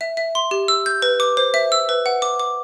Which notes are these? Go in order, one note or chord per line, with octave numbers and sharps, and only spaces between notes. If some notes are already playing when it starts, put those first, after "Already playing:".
E5
E5
C6
G4
E6
G6
B4
D6
C5
E5
E6
B4
F#5
D6
D6